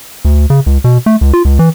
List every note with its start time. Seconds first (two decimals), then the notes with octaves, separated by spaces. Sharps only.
0.25 D2
0.50 C#3
0.66 C#2
0.84 B2
1.06 A3
1.21 C#2
1.33 F4
1.45 C#2
1.59 E3